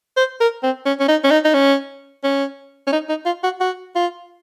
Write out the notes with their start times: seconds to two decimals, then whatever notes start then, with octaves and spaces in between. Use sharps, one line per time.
0.17 C5
0.41 A#4
0.63 C4
0.86 C#4
1.00 C#4
1.09 D#4
1.24 C#4
1.31 D#4
1.45 D#4
1.54 C#4
2.24 C#4
2.87 C#4
2.93 D#4
3.09 D#4
3.26 F4
3.44 F#4
3.60 F#4
3.96 F4